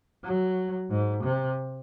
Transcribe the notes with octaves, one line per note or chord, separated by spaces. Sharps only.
F#3
G#2
C3